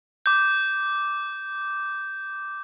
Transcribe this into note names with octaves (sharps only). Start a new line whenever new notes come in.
D6 G6